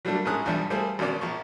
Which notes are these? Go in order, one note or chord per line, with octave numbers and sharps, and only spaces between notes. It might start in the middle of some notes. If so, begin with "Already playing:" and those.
F#3 G3 A3 A#3 D4
A#1 G#2 C#4 G#4 D#6 F#6
B1 E2 F3 G3 D4 E5
G3 A3 A#3 G#4 C5
G#1 B2 A#3 C#4 D5 D6
A#1 F3 C#6